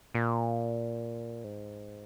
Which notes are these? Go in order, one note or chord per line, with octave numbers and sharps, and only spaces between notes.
A#2
G#2